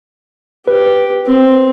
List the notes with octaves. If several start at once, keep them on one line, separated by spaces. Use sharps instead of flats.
G4 B4
C4